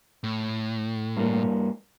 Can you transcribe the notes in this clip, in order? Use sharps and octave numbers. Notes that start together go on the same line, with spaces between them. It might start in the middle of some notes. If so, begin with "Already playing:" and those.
A2
G2 A#3